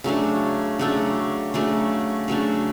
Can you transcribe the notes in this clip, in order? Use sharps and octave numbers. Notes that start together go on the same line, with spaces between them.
C#3 F#3 A3 D4
C#3 F#3 A3 D4
C#3 F#3 A3 D4
C#3 F#3 A3 D4